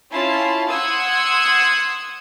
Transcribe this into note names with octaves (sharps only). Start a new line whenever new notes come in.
C#4 E4 F4 A5 C6
F#5 C6 D#6 E6 G#6